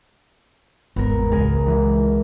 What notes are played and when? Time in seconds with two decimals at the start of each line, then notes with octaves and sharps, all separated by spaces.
0.96 G#1 E2 B3 A#4
1.32 C#2 G#3 G#4 A#4
1.66 E3